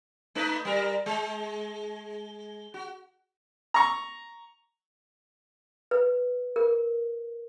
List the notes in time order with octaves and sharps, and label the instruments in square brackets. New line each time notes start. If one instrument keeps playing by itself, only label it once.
[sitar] A3 D#4 B4
G3 A#4
G#3
F#4
[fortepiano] A#5 C#6
[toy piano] B4
A#4